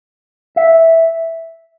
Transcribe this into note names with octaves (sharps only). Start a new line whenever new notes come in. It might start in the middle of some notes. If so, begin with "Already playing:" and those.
E5